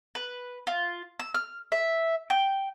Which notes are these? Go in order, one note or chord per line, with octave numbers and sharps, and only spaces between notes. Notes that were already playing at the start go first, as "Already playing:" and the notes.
B4
F4
E6
F6
E5
G5